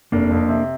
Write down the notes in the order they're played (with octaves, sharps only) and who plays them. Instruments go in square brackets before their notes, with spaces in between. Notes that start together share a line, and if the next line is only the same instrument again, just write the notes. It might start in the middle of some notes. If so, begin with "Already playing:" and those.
[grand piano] F1 [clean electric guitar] A#3 D4
[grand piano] F2
C3